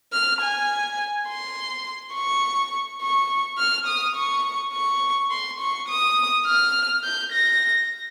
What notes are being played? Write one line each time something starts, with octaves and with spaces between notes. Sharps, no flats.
F6
G#5
C6
C#6
C#6
F6
D#6
C#6
C#6
C6
C#6
D#6
F6
G6
A#6